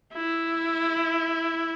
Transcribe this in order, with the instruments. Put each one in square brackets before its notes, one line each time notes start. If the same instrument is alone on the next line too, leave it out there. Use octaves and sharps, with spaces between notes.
[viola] E4